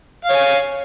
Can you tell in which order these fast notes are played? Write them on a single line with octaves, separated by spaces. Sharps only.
F5 C#5 G#5